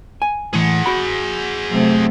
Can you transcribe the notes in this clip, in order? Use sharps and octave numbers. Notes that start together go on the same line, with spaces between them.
G#5
A2 E3 G#4 F#5
F#4 B5
C3 F#3 A3